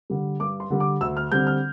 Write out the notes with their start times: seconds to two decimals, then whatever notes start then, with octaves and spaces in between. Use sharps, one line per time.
0.10 D3 G3
0.40 G2 D6
0.60 C6
0.70 D3 G3
0.80 D6
1.01 D2 E6
1.17 F6
1.32 D3 G3 C4 G6
1.47 F6